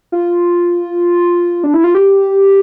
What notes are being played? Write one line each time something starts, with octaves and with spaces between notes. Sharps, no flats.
F4
D4
E4
F4
G4